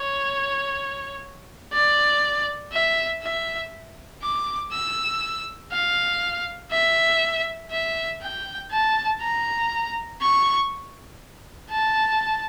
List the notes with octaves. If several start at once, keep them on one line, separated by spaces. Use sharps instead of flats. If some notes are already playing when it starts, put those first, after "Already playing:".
Already playing: C#5
D5
E5
E5
D6
E6
F5
E5
E5
G5
A5
A#5
C#6
A5